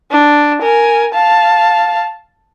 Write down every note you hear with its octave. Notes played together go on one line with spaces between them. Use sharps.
D4
A#4 G#5
F5 A5